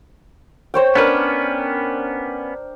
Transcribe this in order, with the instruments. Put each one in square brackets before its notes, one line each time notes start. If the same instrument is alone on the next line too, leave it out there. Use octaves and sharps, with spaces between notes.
[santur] C5 C#5 G5
[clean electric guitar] B3 C#4 B4 [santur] D4 A#4